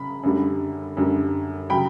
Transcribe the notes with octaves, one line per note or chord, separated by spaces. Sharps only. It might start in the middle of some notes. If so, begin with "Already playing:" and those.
Already playing: C#3 B5
F#2 D3 G3
F#2 D3 G3
C#3 F#3 G5 B5